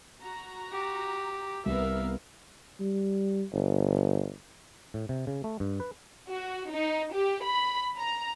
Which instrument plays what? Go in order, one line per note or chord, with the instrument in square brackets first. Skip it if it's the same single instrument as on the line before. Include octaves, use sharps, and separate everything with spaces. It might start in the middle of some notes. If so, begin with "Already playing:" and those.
[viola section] F#4 A#5
[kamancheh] G4
[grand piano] C2 [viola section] B3 A#4 F5 [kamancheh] E5
[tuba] G3
G1
[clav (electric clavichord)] A2
C3
C#3
A3
G2
B4
[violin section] F#4
D#4
G4
B5
A#5